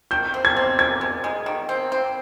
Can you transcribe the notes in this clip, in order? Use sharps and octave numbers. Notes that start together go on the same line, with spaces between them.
D#3 G6
C4
G#6
C4
D#3 G#6
G#3
G#3
D#3
C4
C4